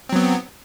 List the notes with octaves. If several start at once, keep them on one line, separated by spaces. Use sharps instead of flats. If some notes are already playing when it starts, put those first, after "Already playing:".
F#3 B3 C4